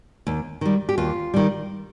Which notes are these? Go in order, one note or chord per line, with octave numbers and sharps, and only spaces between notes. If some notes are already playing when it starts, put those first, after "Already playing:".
D#2
D#3 G3
G4
D#2 F4
D#3 G3